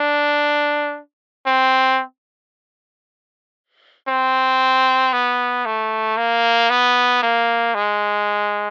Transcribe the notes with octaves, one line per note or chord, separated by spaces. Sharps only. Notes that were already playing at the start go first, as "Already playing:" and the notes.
Already playing: D4
C4
C4
B3
A3
A#3
B3
A#3
G#3